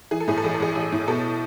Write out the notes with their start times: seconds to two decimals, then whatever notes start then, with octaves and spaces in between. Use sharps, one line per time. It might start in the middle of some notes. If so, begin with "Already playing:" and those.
0.11 E3 G#4
0.20 A4
0.28 A2 G#4
0.38 A4
0.44 A1 G#4
0.54 A4
0.60 A1 G#4
0.75 A1
0.92 A2
1.08 B2 A4